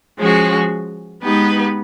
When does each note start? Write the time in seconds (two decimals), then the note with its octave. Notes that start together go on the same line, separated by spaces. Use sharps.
0.17 F3 G#3 C#4 F#4
1.22 G#3 B3 D#4 G4 B4